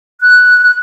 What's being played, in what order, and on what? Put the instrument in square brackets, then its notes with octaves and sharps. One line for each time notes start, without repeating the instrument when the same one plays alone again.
[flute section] F#6